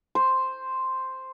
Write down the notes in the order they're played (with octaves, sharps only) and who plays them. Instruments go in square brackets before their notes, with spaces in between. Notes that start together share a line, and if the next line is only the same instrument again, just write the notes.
[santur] C5